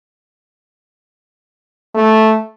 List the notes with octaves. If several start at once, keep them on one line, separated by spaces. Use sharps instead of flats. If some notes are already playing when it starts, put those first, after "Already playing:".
A3